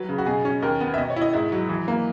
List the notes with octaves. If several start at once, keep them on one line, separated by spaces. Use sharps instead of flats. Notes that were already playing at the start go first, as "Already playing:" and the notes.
Already playing: F#3 B4
C#3
F#4
B2 G#4
C#4
D#2 A#4
B3
E5
B2 D#5
C#5
E4
D#5
G#2 E5
F#3
E3
A#3